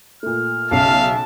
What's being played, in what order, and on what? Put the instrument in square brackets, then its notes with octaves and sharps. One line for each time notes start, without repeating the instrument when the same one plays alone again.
[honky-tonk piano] A#2 A3 [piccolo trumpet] F6
[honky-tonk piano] B1 C#3 [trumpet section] E5 F5 [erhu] A5